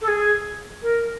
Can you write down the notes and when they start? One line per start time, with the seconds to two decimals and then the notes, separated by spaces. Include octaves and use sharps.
0.01 A4
0.07 G#4
0.82 A#4